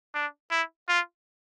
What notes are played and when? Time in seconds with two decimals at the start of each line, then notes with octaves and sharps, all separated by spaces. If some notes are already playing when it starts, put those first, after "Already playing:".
0.14 D4
0.51 E4
0.88 F4